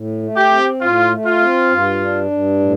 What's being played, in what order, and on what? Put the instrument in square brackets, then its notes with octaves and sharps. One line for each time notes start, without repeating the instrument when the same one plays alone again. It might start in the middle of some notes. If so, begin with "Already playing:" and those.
Already playing: [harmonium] A2
A3
[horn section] G4
[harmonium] C4
[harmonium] A2 [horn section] F4
[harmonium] A3
[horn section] F4
[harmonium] C4
G2
D4
G2
A2